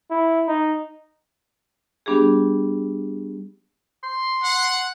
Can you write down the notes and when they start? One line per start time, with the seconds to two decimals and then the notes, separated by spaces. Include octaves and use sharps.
0.11 E4
0.48 D#4
2.06 G3 B3 D4 G4 G#4
4.04 C6
4.44 F#5